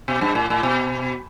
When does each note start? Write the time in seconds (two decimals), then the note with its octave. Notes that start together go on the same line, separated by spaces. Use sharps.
0.08 B2
0.21 G2
0.35 A2
0.50 A2
0.63 B2